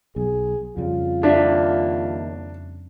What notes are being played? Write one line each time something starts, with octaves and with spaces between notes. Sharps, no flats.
B1 G#4
F2 C#3 G3 F4
D#2 D4 E5